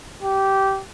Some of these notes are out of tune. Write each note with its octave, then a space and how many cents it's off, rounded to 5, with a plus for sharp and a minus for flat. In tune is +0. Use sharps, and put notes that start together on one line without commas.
G4 -15